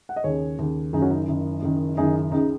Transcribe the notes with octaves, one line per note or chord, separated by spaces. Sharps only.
F#5
D#5
D#2 C#3 G#4 C#5
D#2 C#3
F#1 F#2 D#3 D#4 G#4
C#4 F#4
D#4
F#1 F#2 D#3
F#1 F#2 D#3
F#1 F#2 D#3 D#4 G#4
C#2 C#3 D#4